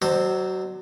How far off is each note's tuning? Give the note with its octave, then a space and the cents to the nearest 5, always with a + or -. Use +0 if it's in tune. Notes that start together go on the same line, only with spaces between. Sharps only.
F#3 +20 D4 +45 C5 +0